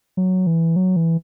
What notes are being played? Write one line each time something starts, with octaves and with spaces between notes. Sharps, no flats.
F#3
E3
F#3
E3